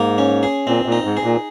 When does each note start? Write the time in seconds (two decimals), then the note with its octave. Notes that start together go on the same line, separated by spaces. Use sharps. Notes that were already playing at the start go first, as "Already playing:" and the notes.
Already playing: G#2 A#3
0.18 C#4
0.43 G#4
0.67 A#2 C4
0.86 A#2
0.92 D#4
1.05 G#2
1.17 G#4
1.24 A#2